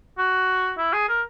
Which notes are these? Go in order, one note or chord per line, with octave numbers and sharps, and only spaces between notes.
F#4
E4
G#4
A#4